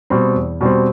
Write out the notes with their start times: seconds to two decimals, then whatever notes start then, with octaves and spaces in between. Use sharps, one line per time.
0.10 B2 G3 C4
0.35 E2
0.61 B2 G3 C4